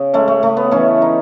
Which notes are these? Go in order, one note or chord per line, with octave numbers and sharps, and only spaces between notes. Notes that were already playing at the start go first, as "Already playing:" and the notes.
Already playing: C#3
G#3 A3 C#4
A3
C#3 A3
B3
E3 A3 C#4
D#4